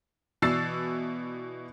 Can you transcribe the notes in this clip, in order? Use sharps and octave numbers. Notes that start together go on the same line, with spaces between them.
B2 E3 D5 E6 A6 C7